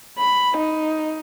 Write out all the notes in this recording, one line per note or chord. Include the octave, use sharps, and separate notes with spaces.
B5
D#4